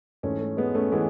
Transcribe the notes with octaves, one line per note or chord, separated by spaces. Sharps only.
G#2 E3 A3 C#4
A3
G#3 B3
A3 C#4
E3 G#3 B3